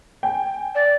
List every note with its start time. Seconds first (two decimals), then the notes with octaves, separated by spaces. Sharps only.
0.23 G5 G#5
0.75 D5